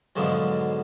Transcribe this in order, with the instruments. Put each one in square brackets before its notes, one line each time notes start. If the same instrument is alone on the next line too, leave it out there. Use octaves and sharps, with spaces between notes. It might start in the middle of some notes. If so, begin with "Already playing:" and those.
[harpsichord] G#2 B2 D3 F3 F#3